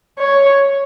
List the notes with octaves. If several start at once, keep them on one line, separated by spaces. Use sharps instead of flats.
C#5